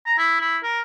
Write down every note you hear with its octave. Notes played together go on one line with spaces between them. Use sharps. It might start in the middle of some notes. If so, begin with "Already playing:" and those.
A#5
E4
E4
A#4